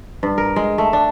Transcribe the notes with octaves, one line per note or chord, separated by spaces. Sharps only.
G2
A#4
G#3
A3
D4